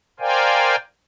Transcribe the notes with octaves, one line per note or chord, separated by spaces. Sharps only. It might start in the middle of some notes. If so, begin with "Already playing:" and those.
A#4 C5 D5 F5 G5 G#5